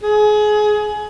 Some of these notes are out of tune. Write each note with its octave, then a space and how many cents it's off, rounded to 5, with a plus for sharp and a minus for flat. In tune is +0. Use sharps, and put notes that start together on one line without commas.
G#4 +25